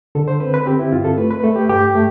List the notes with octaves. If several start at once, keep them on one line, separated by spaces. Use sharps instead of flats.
D3 A4
C5
C4 B4
B4
C4 G4
E4
G2 F4
A4
A3 B4
B4
A3 A4
G4
G2 G4
A3